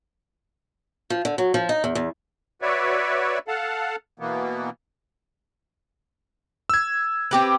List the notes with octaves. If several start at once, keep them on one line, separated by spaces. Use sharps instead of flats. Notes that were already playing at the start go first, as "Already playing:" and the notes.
F3
D3
F#3
F3
D#4
E2
E2
F#4 B4 C#5 D5 E5
A4 F5 F#5 A5
B2 E3 A#3 B3
E6 G#6
C4 G4 B4